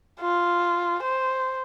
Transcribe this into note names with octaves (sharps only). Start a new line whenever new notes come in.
F4
C5